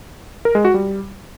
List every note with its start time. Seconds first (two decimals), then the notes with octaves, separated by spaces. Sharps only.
0.45 A#4
0.55 G#3
0.65 F#4
0.74 G3